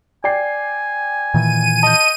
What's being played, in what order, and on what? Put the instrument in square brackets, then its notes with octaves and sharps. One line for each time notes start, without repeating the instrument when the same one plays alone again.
[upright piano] D5 G5 C7 [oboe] G#5
[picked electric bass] A#2 D#3 E3 [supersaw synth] D#7
[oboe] D#5 [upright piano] A5 G6